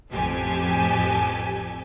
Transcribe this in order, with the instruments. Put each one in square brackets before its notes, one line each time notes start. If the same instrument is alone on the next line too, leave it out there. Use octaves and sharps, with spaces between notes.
[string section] A1 F2 G4 A4 G#5